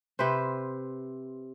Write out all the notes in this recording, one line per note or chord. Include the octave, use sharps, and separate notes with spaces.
C3 B4 C5